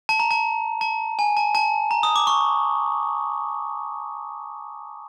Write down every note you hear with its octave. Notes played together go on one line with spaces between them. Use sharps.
A5
A#5
A5
A5
G#5
A5
A5
A#5
D#6
D6
C#6